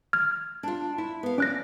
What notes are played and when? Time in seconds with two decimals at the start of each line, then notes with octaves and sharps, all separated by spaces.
0.13 F6 G#6
0.63 D4 F4
0.98 E4
1.23 B3 F5
1.38 C#4 D5 F#6 A#6